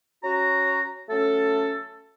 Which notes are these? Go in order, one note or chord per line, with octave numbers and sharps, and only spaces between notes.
C#4 F#4 A#5
F#3 A3 C#4 A4